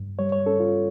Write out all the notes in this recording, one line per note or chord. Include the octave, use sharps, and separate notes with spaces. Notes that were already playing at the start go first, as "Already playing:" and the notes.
Already playing: G2
G3 C#5
C#5
C#4 A4
F4